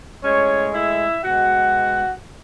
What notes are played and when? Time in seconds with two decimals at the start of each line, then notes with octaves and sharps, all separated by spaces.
0.24 A2 G#3 C#4 C#5
0.74 E4 E5
1.23 B2 G#3 F#4 F#5